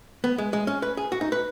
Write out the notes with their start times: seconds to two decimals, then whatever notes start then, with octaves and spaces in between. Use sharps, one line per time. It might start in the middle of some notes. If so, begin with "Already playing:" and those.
0.24 B3
0.38 G#3
0.53 G#3
0.67 C#4
0.82 B4
0.97 G#4
1.12 F#4
1.21 D#4
1.32 B4